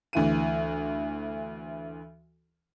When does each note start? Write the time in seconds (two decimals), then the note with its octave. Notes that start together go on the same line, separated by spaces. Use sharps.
0.13 D2 E3 D#7